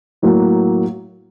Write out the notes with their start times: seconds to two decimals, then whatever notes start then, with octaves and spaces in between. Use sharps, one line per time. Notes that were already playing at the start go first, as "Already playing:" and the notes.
0.22 A2 F#3 A#3